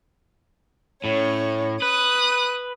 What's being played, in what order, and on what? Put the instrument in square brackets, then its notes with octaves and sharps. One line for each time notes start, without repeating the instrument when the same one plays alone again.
[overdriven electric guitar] A2 [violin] C#4 C#5
[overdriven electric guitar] B4 [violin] D#6 F#6